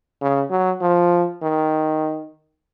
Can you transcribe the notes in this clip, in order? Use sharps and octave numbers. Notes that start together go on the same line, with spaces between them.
C#3
F#3
F3
D#3